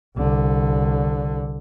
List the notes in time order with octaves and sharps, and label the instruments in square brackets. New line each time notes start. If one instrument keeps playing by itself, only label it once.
[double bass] C2 D3